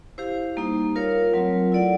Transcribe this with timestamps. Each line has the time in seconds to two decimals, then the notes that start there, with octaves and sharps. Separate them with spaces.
0.18 E4 G4 C5 F5
0.57 G3 A#3 D#4
0.95 F4 A#4 C#5 F5
1.33 F#3 A3 C4 F4 A#4
1.72 E4 A4 D5 F#5